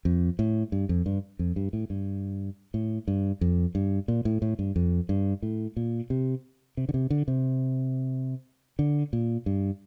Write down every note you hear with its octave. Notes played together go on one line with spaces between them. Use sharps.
F2
A2
G2
F2
G2
F2
G2
A2
G2
A2
G2
F2
G2
A#2
A2
A2
G2
F2
G2
A2
A#2
C3
C3
D3
C3
D3
C3
D3
A#2
G2